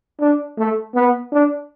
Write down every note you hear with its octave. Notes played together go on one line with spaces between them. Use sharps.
D4
A3
B3
D4